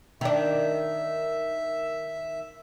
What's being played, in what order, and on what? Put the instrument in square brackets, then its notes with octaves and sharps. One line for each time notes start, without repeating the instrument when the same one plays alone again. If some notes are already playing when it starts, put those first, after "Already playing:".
[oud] D#3 D4 [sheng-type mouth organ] E5